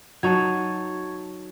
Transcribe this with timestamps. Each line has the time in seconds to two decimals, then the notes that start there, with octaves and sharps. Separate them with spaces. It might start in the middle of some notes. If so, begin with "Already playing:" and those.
0.23 F#3 D#4 A5 C#6 G#6